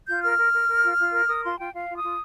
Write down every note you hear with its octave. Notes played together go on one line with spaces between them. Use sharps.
F4 G6
A#4 F6
A#4
A#4
A#4
F4
F4
A#4
A#4 D#6
F4 C6
F4 G5
F4 F5
F4
D#6
F4